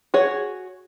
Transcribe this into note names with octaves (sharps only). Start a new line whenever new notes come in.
F#4 G#4 C#5